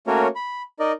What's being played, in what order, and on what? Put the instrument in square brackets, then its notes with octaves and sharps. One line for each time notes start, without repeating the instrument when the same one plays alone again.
[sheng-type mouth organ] A3 A#3 C#4 F#4 A#4 C#5
B5
D#4 A#4 D5 D#5